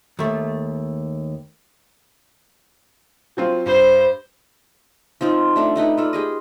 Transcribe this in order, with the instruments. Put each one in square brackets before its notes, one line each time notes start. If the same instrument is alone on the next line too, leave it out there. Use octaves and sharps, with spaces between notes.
[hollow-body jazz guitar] D#2 A3
[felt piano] F#3 C4 F4
[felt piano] G2 [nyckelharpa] C5
[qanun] F3 C4 D#4 F4
A3 D4 A4
A3 D#4 A4 B4
F4 A4 D5
G4 G#4 D#5